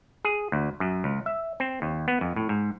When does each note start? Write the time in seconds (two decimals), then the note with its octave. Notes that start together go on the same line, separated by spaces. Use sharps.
0.25 G#4
0.52 D2
0.80 F#2
1.04 C#2
1.26 E5
1.60 C4
1.82 D#2
2.08 B3
2.21 F2
2.36 A2
2.49 G#2